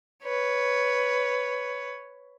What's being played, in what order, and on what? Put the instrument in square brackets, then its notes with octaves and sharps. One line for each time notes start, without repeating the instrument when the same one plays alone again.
[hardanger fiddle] B4 C#5